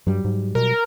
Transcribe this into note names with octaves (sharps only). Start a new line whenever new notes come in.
G2 F#3 G3
G#2
B2 A#4